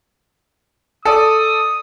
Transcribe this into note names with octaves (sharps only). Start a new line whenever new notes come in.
A4 D5 D#6